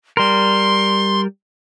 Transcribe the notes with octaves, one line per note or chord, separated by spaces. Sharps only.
G3 A#4 C6